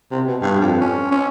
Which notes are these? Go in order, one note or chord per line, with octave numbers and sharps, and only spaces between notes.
C3
B2
G2
F2
C#4
C#4